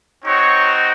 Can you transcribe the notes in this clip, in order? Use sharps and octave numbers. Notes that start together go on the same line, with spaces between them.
C4 D#4 F#4 C#5